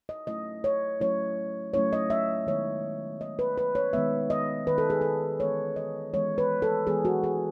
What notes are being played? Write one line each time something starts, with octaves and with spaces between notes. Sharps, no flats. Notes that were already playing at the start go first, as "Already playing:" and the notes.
D#5
F#3 A3 C#4 E4 D#5
C#5
F#3 A3 C#4 E4 C#5
F#3 A3 C#4 E4 C#5
D#5
E5
D#3 G#3 B3 C#5
D#3 G#3 B3 D#5
B4
B4
C#5
D#3 G#3 B3 E5
D#5
D#3 G#3 B3 B4
A4
G#4
A4
E3 G#3 B3 C#5
D#5
E3 G#3 B3 C#5
B4
A4
E3 G#3 B3 G#4
F#4
G#4